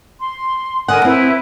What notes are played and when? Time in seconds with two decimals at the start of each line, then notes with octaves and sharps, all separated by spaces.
0.20 C6
0.88 D3 A#4 F#5 G#5 D#6
1.05 C4 E4 B4